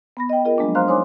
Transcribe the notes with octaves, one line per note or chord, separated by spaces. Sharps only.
B3 B5 A#6
D#5 G5
F4 G#4 A#4 D#5
F3 F#3 G#3 A#3 D4
C5 F5 A#5 C6 F6 F#6
D#4 C5 C#5 G#5 C6 D6